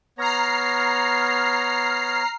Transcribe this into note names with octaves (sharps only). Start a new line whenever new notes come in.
B3 C#5 A#5 F6 C7